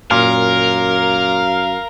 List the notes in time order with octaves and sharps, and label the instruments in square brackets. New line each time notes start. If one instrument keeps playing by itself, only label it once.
[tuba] F#2 [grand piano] A#2 [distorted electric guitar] A#4 [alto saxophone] F5